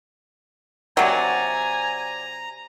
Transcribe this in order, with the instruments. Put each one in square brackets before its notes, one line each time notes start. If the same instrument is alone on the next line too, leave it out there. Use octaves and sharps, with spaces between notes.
[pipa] C3 F#3 [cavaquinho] D5 F#5 [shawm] G#5 [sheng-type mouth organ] A#5